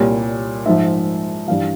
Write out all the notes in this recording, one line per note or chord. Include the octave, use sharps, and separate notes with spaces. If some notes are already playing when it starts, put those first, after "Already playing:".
Already playing: C2 A#2 G3 C#5
G#2 F3 E5
G2 E3 G3 F5